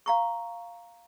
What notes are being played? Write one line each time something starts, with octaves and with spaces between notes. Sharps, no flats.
F5 A#5 C#6